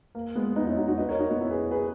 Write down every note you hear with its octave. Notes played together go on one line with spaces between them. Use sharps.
A#3
G#3 B3
B3 D#4
C#4 E4
D#4 F#4
D#4 F#4
B4 D#5
A#4 C#5
D#4 F#4
B3 D#4
C#4 E4
G#4 B4
G#4 B4